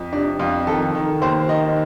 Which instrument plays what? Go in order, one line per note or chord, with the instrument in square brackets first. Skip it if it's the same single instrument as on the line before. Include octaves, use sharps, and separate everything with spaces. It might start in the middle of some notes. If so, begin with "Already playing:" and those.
Already playing: [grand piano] F2
C3 D4
F2 F4
D#3 A4
D#3
D#2 C5
D#3 D#5